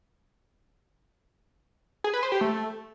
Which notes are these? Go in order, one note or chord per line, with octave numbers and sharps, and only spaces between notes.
G#4
B4
C5
G4
A3